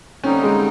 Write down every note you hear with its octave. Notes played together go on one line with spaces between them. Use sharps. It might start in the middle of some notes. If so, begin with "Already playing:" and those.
D#2 D3 G3 C4 C#4 D#4
G#3